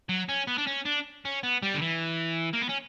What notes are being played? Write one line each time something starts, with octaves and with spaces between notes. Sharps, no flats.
F#3
C#4
B3
D4
C#4
D4
C#4
B3
G3
D3
E3
A#3
B3
C#4